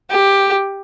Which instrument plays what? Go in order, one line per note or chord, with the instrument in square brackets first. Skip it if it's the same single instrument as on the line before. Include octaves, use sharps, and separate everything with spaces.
[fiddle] G4